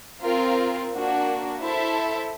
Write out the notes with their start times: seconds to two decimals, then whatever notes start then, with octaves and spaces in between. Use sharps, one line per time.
0.23 C4 F4 A#4
0.92 A#3 D4 F#4
1.61 E4 A4 C5 E5